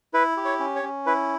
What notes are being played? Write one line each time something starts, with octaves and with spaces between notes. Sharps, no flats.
E4 B4
G4
C#5
C#4
C#5
C#4
E4 B4